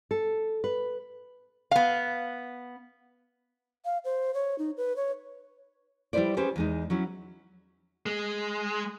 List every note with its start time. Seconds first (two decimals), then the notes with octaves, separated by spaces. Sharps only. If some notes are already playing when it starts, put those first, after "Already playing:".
0.11 A4
0.64 B4
1.71 B3 F5
3.85 F5
4.05 C5
4.34 C#5
4.58 D#4
4.77 B4
4.96 C#5
6.13 G3 E4 F4 B4 C5 D5
6.37 C#4 G4 G#4 B4 C5
6.56 E2 G#3 D#4
6.90 F#3 C#4 E4
8.06 G#3